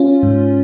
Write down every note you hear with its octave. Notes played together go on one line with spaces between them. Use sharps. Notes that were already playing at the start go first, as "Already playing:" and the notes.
Already playing: C#4 F4
G#2